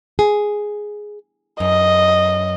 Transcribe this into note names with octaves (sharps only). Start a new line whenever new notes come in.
G#4
F#2 D#5